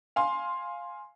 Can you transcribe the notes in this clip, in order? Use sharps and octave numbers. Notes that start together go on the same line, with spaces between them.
F5 G#5 C6